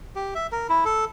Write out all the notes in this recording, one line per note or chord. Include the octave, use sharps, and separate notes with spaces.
G4
E5
A#4
E4
A4